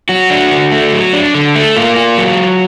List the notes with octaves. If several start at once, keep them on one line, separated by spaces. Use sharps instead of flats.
F#3 F#4
D4
D3
A3
F#3
D4
D3
A3
A#3 F4
F4
F#3